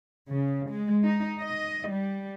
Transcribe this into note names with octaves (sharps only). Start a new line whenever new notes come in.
C#3
G#3
D#4
D#5
G3